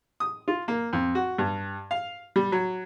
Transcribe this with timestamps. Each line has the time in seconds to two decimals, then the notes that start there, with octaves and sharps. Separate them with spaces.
0.20 D#6
0.48 F4
0.68 A#3
0.93 F2
1.15 F#4
1.38 G2
1.91 F5
2.36 G3
2.52 F#3